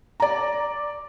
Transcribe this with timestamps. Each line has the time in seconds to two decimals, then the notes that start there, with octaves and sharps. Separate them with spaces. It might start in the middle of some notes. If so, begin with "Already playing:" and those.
0.20 D5 A#5